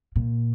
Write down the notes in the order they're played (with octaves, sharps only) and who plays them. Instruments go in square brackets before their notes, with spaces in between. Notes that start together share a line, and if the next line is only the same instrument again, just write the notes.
[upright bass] A#2